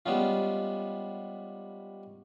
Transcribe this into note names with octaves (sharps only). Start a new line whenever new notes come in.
G3 G#3 B3 C#4 F4